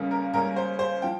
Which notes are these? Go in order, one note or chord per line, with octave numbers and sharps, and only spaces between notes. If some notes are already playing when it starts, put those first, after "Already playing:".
Already playing: C#2 C#3 G3 A#3 C#4
A#4
C#2 C#3 G3 A#3 C#4 A#4
C5
C5
F3 G5